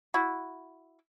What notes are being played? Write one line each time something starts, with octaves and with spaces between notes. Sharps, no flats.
E4 F#4